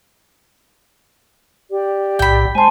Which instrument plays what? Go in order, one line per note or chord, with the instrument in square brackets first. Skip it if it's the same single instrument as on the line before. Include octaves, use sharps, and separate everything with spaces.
[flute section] G4 D5
[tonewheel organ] B1 A2 [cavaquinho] G5 B5
[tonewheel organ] G#3 [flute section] C5 F#5 C6 [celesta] G#5 A5